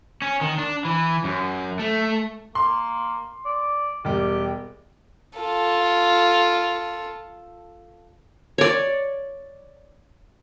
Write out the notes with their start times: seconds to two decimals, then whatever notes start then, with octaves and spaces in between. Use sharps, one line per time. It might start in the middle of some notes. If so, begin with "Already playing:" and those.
0.22 C#4
0.41 D#3
0.58 D4
0.85 E3
1.24 F#2
1.79 A3
2.55 A#3 C6
3.45 D5
4.05 E1 G3 G4
5.39 F4 A4
8.58 C#5 D5